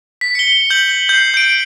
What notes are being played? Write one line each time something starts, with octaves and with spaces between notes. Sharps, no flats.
B6
C#7 G7
G6 F#7
G7
G6 C7
G6 D7